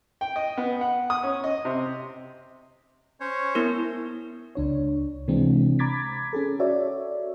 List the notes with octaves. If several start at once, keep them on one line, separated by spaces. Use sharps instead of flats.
G5
D#5
B3
F#5
D#6
C#4
D#5
C3
C#4 C5 C#5
B3 E4 A#4
C#2 D4 C#5
C3 E3 G#3 C4 D4
A#5 B5 D6 G#6 A6 B6
C#4 G#4 A4
F#4 A4 C#5 D5 E5